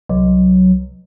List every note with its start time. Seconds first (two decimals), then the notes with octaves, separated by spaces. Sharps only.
0.09 C2 F#3